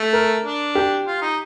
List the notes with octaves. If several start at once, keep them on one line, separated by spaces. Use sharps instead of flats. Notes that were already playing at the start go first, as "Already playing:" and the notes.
Already playing: A3
A#4
D4
G4
F4
D#4